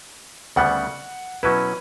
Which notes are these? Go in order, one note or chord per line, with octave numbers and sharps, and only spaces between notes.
D2 C#3 G3 B3 F#5
B2 F#3 C#4 E4 B4